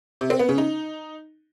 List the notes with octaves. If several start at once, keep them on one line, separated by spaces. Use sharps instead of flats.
C3
C4
B3
C#3
D#4